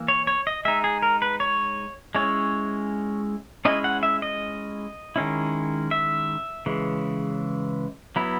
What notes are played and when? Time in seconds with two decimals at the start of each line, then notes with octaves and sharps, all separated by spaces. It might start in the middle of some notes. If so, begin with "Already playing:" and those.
Already playing: E3 A#3
0.08 C#5
0.27 C#5
0.47 D#5
0.65 G#3 D#4 E5
0.84 G#4
1.03 A#4
1.22 B4
1.40 C#5
2.15 G#3 C#4 E4 C#5
3.65 G#3 C#4 E4 D#5
3.84 F#5
4.03 E5
4.22 D#5
5.16 D#3 G#3 C#4 E4
5.91 E5
6.66 C#3 E3 G#3
8.16 F#3 B3 E4